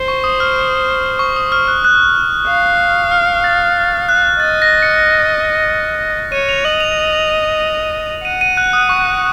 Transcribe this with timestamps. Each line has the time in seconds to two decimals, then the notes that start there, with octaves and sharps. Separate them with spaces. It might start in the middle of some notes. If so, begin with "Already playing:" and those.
Already playing: C5
0.08 C#6
0.24 D#6
0.40 F6
1.19 C#6
1.36 D#6
1.52 F6
1.68 F#6
1.84 F#6
2.48 F5
3.11 F6
3.44 A6
4.09 F#6
4.40 D#5 A6
4.62 A#6
4.82 C#7
6.32 C#5 D#7
6.49 F7
6.65 D#5 F#7
6.80 F7
8.25 F#5 D#7
8.41 D#7
8.57 F#6
8.73 D#6
8.89 C#6